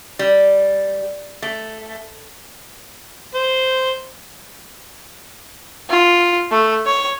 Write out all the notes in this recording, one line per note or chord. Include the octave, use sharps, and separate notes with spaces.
G3
A3
C5
F4
A3
C#5